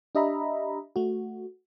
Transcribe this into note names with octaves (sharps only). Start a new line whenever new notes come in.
D4 G4 D#5 E5 A#5 B5
A3 F#4